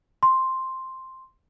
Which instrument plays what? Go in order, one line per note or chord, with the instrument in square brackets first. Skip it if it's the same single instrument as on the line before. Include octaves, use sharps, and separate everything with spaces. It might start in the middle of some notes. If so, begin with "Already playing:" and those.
[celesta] C6